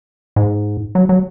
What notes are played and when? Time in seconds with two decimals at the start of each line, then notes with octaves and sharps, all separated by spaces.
0.36 G#2
0.95 F#3
1.09 F#3